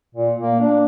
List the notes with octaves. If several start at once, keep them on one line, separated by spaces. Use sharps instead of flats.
A#2
A#3
D4